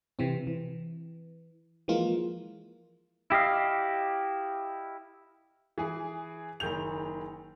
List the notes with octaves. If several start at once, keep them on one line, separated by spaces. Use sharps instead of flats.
C3 E3 C4
E3
E3 F3 G#3 A#3 F4
E4 G4 D#5 F5
E3 G#4
F#1 D#3 G#4 G6 F7